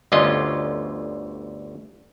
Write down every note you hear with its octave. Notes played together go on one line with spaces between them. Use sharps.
G1 D2 D3 C#4 F4 D#5